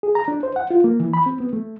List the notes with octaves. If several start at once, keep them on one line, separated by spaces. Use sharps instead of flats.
G#4
A#5
D4
C5
F#5
F4
A#3
E3
B5
C4
B3
A3